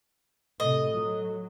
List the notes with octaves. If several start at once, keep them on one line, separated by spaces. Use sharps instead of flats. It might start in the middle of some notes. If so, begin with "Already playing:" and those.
A2 C3 A4 D#5
F#3